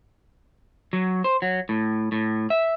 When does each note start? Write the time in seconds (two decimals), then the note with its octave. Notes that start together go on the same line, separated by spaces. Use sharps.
0.93 F#3
1.24 C5
1.42 F#3
1.69 A2
2.12 A2
2.50 E5